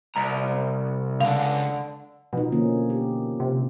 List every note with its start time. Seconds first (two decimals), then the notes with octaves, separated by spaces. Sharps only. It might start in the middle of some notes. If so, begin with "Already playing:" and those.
0.16 C2 A#5
1.21 C#2 D3 F5
2.33 B2 F3 D#4
2.52 D3 A#3 C#4
2.90 G4
3.40 C3